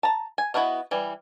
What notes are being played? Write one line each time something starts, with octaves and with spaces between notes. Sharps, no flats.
A5 A#5
G#5
B3 E4 F#4 A#4 D#5
E3 G3